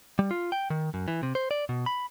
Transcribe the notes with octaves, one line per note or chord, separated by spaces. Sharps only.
G3
F4
G5
D#3
F#2
E3
C3
C5
D5
B2
B5